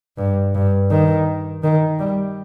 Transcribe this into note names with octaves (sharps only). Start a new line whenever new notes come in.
G2
G2
D#3
D#3
G3